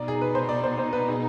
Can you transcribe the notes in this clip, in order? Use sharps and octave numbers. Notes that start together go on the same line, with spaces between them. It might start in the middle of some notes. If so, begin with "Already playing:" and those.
Already playing: B2 B3 D#4 D5
G#4
B4
C5
D5
C5
C5
B4
G#4